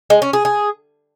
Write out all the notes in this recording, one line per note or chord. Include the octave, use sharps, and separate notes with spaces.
G#3
C#4
G#4
G#4